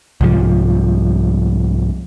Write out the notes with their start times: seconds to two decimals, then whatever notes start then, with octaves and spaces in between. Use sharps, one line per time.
0.21 C2 G#2 F3